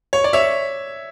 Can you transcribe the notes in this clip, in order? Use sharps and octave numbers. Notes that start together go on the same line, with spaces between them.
C#5
D5
C#5 E5